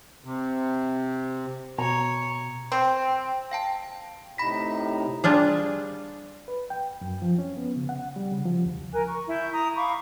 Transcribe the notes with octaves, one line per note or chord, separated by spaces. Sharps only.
C3
B2 C#5 A#5
C4
F5 G5 A5
A2 C3 D#4 B5 A#6 B6
G3 D4 F4 G#4
B4
G5
F#2
F3
C#4
B3
C#3
F#5
G3
C#3
F3
D2
A#4 G#5 F#6
C#6
E4 G6
A#5 D#6
F5 B5 C#6 D6